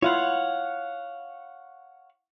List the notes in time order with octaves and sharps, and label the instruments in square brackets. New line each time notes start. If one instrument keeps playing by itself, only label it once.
[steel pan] E4 F4 [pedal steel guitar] C#5 F5 F#5